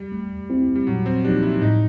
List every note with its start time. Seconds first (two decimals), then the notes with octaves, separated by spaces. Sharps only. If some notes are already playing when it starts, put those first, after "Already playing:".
Already playing: G3
0.12 A3
0.50 C4 E4
0.75 G3
0.87 A#2 F#3
1.06 C4
1.25 F3 A#3 D4 D#4 G4
1.43 E4
1.62 A2 D#4